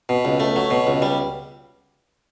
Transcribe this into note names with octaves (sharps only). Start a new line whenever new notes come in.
B2
C#2
A3
F#3
B2
C#2
G3